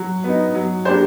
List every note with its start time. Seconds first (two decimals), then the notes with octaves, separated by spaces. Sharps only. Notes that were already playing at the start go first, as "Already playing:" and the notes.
Already playing: F#3
0.24 B3 D#4
0.55 F#3
0.85 A#3 D4 G4 C5